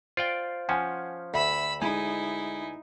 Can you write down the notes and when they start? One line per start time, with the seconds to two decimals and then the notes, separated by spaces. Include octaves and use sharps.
0.17 F4 C5 D5 F5 G5
0.69 F3 C#4 F#5 G#5 C6
1.34 D2 E5 B5 E6
1.82 G#3 D#4 E4 G#5